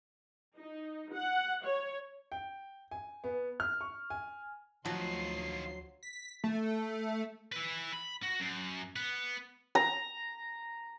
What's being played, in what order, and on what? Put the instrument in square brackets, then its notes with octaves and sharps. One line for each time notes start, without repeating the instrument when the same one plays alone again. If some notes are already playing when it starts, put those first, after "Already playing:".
[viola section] D#4
F#5
C#5
[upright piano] G5
G#5
B3
F6
C#6
G#5
[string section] D2 C6 C7 [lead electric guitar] D#3 F4 [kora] F3 [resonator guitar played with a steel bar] F#3
[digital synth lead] B6
A3
[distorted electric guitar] E4 B4
B5
F#4
F#2
B3
[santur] A#5